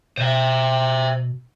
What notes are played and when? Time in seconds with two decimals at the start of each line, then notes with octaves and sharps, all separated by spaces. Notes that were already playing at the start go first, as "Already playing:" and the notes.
0.17 B2 C5 E5